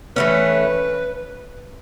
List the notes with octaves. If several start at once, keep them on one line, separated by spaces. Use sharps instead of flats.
E3 A3 C#4 B4